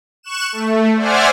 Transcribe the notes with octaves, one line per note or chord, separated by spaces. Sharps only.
C#6 F#6 E7
A3
C5 D5 E5 F#5 G#5 F6